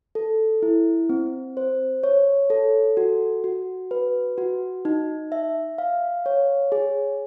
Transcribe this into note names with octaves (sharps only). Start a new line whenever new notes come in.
A4
E4
C4
C5
C#5
A4
F#4
F#4
B4
F#4
D#4
E5
F5
C#5
G#4